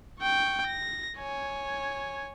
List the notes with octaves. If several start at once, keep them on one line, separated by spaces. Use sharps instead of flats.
G5 C#6
A#6
C#5 G#5